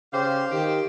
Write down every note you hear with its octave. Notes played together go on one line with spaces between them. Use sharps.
C#3 G4 C5 F5
D#3 G4 G5